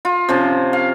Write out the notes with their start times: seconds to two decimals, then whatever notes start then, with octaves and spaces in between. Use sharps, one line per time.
0.05 F4
0.29 C3 F3 C#4
0.73 F5